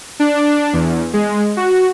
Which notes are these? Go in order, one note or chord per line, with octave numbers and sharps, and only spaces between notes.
D4
E2
G#3
F#4